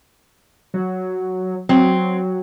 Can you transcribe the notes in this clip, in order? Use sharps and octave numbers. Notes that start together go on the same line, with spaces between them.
F#3
F#3 C4